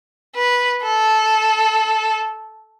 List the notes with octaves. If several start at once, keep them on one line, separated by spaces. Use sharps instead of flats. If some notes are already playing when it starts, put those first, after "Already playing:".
B4
A4